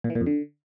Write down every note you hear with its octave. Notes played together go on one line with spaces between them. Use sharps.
A#2
E3
A#2
F2
D3